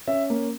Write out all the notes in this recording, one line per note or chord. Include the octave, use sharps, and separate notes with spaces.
C#4 E5
A#3